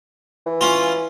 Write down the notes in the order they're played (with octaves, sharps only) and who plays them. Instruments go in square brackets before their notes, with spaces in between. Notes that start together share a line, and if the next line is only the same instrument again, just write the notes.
[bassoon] E3
[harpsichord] C#4 F4